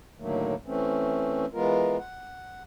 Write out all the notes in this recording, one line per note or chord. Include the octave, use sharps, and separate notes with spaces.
A2 D3 D#3 F#3 A3 A#3
E3 A3 C4 C#4
E3 G#3 B3 F4 A#4
F#5